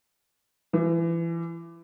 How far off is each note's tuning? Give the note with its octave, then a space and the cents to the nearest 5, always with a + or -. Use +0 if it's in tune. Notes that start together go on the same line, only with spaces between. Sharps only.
E3 +25